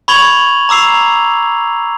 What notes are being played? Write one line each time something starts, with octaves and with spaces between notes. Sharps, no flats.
B5 C#6 G#6 F7 F#7
A#5 D6 E6 C7 F7